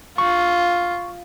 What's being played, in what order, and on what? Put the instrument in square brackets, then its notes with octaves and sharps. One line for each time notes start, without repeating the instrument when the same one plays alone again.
[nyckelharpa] F4 [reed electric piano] C#6